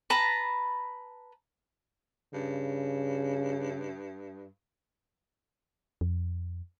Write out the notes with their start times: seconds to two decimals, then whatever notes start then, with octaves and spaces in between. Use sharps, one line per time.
0.10 B4 A5 A#5
2.34 G2 C#3
6.01 F2